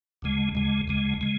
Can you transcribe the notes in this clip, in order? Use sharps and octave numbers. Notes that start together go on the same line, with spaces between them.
D2 C#3 G#3
D2 C#3 G#3
D2 C#3 G#3
C#3 G#3